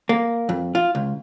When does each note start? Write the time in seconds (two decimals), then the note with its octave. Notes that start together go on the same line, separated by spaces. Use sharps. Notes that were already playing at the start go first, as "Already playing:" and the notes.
0.09 A#3
0.49 F2
0.75 F4
0.95 C#2